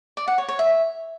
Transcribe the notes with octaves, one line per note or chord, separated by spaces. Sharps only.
D5
F#5
C#5
C#5
E5